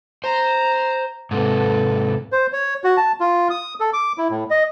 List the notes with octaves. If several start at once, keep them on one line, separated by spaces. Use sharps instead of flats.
C5 A#5
G#2 C3 A4 B4
C5
C#5
F#4
A5
F4
D#6
A4
D6
E4
A2
D#5